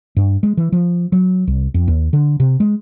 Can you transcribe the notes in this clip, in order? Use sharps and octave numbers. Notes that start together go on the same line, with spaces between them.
G2
G#3
E3
F3
F#3
C2
F2
D#2
D3
C3
G#3